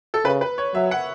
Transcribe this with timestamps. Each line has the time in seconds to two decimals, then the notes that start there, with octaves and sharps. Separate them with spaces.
0.14 A4
0.25 C#3 B4
0.41 B4
0.58 C#5
0.74 F#3 E5
0.91 F#5